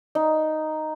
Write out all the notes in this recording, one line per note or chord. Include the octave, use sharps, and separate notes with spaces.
D#4